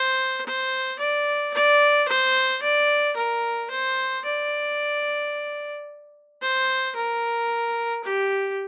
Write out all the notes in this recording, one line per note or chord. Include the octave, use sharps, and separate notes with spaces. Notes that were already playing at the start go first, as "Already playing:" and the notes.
Already playing: C5
C5
D5
D5
C5
D5
A#4
C5
D5
C5
A#4
G4